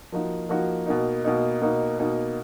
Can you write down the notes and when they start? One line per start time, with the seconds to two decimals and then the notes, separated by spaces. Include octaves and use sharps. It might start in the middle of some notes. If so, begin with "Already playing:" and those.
0.12 F3 A#3 D#4 F#4
0.49 F3 A#3 D#4 F#4
0.86 B2 A#3 D#4
1.24 B2 A#3 D#4
1.62 B2 A#3 D#4
1.99 B2 A#3 D#4